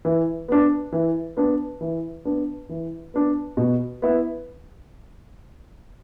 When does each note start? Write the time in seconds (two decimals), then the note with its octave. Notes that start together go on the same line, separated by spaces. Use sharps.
0.05 E3
0.48 B3 D4
0.92 E3
1.37 B3 D4
1.81 E3
2.25 B3 D4
2.69 E3
3.14 B3 D4
3.57 B2
4.02 B3 E4